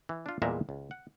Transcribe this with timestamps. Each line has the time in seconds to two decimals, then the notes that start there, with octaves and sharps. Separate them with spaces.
0.09 E3
0.26 D4 F4
0.42 E2 A#2 G3 G#3 E5 A#5
0.69 C#2
0.91 F#5